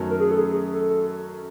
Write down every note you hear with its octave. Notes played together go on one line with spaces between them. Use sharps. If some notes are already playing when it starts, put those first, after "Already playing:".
Already playing: F#2 D#3 F#3 A3 C#4
A#4
G#4
A4
G#4
A4